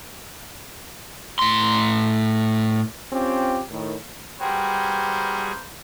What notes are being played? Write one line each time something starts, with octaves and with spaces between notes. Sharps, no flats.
A2 C6
C4 C#4 F4 G4
A2 D#3
G3 A#3 F#4 G#4 B4 C5 G5